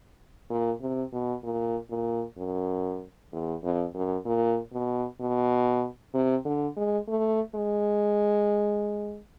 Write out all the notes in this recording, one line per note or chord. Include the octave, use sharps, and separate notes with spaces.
A#2
C3
B2
A#2
A#2
F#2
E2
F2
F#2
A#2
B2
B2
C3
D3
G#3
A3
G#3